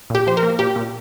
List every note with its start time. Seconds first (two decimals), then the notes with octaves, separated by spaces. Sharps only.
0.10 A#2 G4
0.27 F3 C5
0.37 A#4
0.43 A#3
0.59 A#2 G4
0.76 A#2